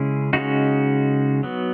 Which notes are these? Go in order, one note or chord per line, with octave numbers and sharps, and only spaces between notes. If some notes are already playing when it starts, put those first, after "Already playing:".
Already playing: C#3 G#3 C#4 E4 G#4
C#3 G#3 C#4 D#4 F#4
F#3 B3